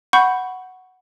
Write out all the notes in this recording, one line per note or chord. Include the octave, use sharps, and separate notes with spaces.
F#5 B5 C#6 G6